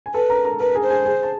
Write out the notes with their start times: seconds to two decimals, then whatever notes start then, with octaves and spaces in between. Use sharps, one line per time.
0.06 G#5
0.14 A4 B4 A5
0.30 A#4 A#5
0.45 A#4 A#5
0.60 A#4 B4 A#5
0.75 G#4 G#5
0.83 C5
0.90 G#4 G#5
1.05 G#4 G#5
1.23 A5